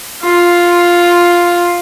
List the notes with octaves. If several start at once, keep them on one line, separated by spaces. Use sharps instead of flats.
F4